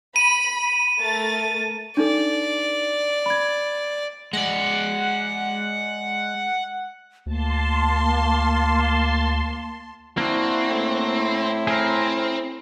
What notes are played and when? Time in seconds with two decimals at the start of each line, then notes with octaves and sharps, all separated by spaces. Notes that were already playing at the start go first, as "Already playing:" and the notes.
0.16 B5 D#7
0.99 A3 A#4 A6
1.97 D4 D#4 A4 D5
3.26 B5 G#6
4.33 G#3 D5 F#5
7.26 D2 A#3 A5 C6
10.17 A#3 C4 D4 E4 F#4
10.71 A2
11.67 C4 G#4 A#4